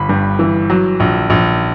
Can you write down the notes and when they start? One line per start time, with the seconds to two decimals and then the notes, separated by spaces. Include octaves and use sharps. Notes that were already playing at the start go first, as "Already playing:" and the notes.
Already playing: G1 B5
0.09 G2
0.39 E3
0.70 F#3
1.00 A#1
1.30 A#1